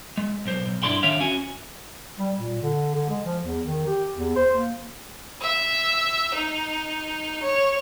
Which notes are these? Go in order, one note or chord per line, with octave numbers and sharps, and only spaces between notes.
G#3
B1 C5
B1
G2 D4 E4 D5 C6
D#3 D4 C#5 E5 F5
C#4 F#4 G#5
G3
A#2
D3
D3
G#3
F3
E2
D#3
G4
E2
C5
A#3
E5
D#4
C#5